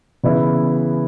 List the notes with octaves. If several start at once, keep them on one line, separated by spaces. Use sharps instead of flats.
C#3 E3 B3 E4